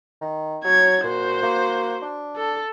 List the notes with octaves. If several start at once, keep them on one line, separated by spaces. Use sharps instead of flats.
D#3
F#3 C#5 G#6
A#2 F#4 C5
A#3
D4
A4